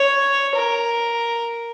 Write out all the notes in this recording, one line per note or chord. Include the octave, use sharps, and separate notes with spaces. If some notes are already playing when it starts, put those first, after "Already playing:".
Already playing: C#5
A#4